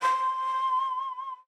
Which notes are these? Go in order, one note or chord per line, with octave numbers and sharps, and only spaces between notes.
C6